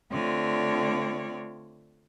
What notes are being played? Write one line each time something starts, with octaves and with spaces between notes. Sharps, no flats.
D3 A3 C4 F4 C#5 D5